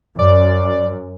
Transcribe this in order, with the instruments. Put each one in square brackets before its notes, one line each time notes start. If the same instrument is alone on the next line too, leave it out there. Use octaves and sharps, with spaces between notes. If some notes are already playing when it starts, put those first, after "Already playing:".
[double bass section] F#2 [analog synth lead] D5